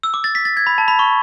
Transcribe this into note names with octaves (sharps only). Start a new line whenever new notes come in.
E6
D6
A6
B6
A6
G#6
B5
A5
B5
C#6